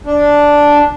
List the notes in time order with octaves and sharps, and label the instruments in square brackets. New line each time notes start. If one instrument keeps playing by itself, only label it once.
[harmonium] D4